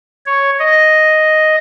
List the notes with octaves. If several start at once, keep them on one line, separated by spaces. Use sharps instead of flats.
C#5
D#5